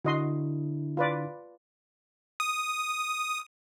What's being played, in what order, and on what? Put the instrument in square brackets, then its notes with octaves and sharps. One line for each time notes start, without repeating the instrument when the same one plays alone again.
[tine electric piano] D3 D4 E4 [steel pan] F#4 D#5 C6
[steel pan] F4 B4 D5
[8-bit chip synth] D#6